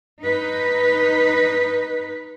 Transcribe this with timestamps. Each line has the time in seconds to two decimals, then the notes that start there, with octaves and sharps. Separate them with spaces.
0.23 D#4 B4